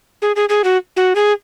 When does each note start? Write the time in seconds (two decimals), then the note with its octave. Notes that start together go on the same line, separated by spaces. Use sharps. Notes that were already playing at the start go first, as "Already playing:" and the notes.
0.22 G#4
0.36 G#4
0.49 G#4
0.64 F#4
0.96 F#4
1.15 G#4